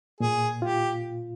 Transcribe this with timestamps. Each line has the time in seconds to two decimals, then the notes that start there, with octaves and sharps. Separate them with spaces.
0.20 A#2 G#4
0.62 F4 G4